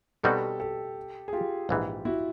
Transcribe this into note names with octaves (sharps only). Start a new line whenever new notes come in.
B2 G3 C4 D#4 F#4 G4 A4
G4 A4
G#4
F4 G4
A#1 G#2 E3
E4 F#4